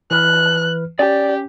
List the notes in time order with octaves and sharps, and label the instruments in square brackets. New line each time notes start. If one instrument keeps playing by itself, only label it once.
[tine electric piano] E3 B4 F6 [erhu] F#6
[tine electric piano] C#4 [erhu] G4 [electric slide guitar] D5